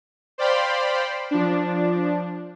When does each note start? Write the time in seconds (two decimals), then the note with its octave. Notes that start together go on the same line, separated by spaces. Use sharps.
0.38 C5 D5 F5 G5 B5 C6
1.31 F3 D4